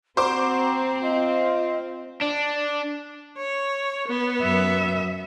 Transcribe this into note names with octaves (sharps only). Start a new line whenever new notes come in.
C4 F#4 C5 A#5 D6
F4 D#5
D4
C#5
B3
F#2 E5